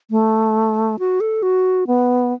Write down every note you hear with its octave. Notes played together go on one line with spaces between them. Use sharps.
A3
F#4
A4
F#4
B3